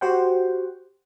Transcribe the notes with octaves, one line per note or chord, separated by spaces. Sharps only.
F#4 G4 C5 F#5 G5